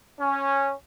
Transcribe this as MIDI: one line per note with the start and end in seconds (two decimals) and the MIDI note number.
0.20 0.73 61